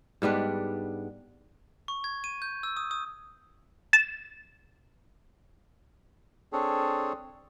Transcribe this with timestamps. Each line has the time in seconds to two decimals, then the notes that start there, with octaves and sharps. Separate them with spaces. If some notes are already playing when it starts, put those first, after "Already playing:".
0.22 G#2 G3 B3 D4
1.88 C#6
2.04 G#6
2.24 D#7
2.42 G6
2.63 E6
2.77 D#6
2.91 D#6
3.93 A6 E7
6.53 C4 D4 G#4 A4 C#5